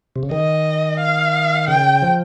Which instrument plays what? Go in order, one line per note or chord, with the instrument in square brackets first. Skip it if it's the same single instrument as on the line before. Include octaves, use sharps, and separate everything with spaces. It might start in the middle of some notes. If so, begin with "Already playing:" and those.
[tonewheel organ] C3
C#3
[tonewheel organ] D#3 [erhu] D#5
[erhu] F5
[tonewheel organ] C#3 [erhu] G5
[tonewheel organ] F3